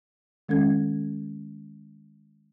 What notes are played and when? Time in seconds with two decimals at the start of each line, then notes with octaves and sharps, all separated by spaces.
0.49 D#3 G#3 C#4 A4 G#6